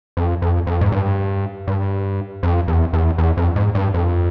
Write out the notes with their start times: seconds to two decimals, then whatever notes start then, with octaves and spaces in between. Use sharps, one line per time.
0.17 F2
0.42 F2
0.67 F2
0.81 G#2
0.92 G2
1.67 G2
2.43 F2
2.68 E2
2.93 E2
3.18 E2
3.37 F2
3.56 G#2
3.75 G2
3.94 F2